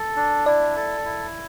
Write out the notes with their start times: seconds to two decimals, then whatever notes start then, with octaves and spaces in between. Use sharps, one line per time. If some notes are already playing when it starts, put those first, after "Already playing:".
Already playing: A4
0.16 D4
0.46 E4 D5
0.76 A4
1.05 E4